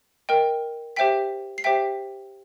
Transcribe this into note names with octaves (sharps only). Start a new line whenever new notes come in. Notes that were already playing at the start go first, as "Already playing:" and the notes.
A#4 D#5 G5
G4 C5 E5 G5 B6
C7
G4 C5 E5 G5 B6